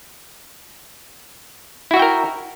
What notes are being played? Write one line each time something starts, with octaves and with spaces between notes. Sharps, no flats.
E4 F#4 A#4 E5 G5